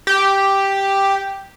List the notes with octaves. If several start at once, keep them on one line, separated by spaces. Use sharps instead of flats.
G4